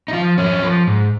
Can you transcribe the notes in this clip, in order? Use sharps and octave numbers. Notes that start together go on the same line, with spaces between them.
D#4
F3 F4
F2 C#4
F3
G#2